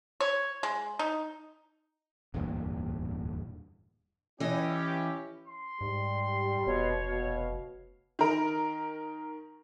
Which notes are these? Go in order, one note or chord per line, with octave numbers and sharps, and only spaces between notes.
C#5
G#3
D#4
D1 E2 G2 A#2
E3 C#4 E4 G4 D#5
C6
G#2 G3
F1 B2 C#5
B2 F5
D#3 A#4